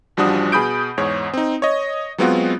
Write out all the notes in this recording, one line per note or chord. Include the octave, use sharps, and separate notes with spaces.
A1 F3 G3 D4 F#4 D#6
B2 G#4 B5 D#6 G6 D7
E2 G#2 C#5
C4 D#4
C#5 D#5
F#3 G#3 B3 C4 F4 F#4